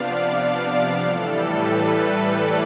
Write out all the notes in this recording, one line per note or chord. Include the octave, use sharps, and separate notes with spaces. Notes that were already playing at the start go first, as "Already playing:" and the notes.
Already playing: C3 F3 B3 D4 D5 F5
A2 E3 G3 A4
B4
D5